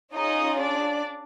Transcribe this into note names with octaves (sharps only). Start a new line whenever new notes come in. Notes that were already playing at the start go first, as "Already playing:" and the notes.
C#4 D#4 F4 G#4 D#5
D4 D5